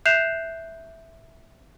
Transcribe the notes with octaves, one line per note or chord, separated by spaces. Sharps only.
E5 F#6 G6 C7 E7 F7